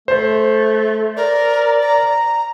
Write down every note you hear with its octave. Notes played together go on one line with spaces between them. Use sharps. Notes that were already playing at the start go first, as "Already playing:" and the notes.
A3 C5
A#4 D5
A#5